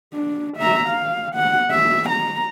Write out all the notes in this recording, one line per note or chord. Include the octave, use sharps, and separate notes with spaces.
D4
E5 A#5
F5
F#5
E5
A#5